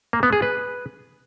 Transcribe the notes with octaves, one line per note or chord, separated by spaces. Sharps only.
A#3
B3
G#4
B4